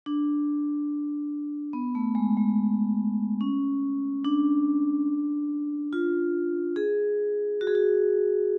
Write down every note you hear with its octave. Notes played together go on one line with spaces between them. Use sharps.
D4
B3
A3
G#3
G#3
C#4
D4
F4
G#4
F#4
G#4
F#4